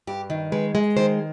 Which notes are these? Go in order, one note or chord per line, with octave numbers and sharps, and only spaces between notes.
G2 G4
D#3
G#3 B4
G#3
D#3 C5